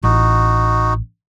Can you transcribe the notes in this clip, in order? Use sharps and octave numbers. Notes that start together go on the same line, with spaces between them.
A1 D#4 F#4